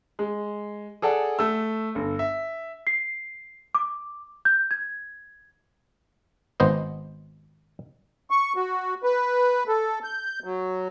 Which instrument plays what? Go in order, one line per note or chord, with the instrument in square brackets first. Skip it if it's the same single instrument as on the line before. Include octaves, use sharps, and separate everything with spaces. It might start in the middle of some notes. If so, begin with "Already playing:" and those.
[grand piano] G#3
G#4 A4 D5 F#5
A3 E6
G1
E5
[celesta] C7
D6
G6
G#6
[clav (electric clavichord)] G#1 B3 C5 D#5
[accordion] C#6
F#4
B4
A4
G6
F#3